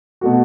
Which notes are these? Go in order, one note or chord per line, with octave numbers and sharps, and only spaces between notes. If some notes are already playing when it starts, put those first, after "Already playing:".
B2 A3 F#4